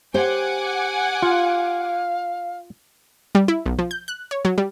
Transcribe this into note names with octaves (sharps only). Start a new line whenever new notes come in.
G4 C5 F#5 G#5 D6
F4 F5
G3
E4
B1
F3
G6
F#6
C#5
F#3
G3